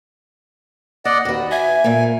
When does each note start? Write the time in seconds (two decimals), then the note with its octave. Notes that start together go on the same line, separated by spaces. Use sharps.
1.05 A#3 D5 D#5 F#5
1.25 D#2 F#4 B4
1.51 E5 G#5
1.84 A#2 A#3